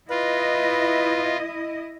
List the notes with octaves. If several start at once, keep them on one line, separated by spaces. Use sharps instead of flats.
E4 F4 B4 D#5